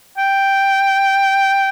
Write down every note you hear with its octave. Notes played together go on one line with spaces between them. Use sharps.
G5